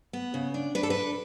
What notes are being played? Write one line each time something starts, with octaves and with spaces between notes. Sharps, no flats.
B3
C#3
D4
D4 B4
A4
D4 B4